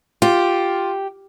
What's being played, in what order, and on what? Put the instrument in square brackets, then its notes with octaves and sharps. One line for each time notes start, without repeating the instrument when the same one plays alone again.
[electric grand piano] F4 [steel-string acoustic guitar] G4